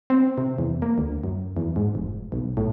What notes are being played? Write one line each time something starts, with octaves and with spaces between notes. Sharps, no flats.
C4
C3
E2
A#3
D2
F#2
E2
G#2
F1
B1
A2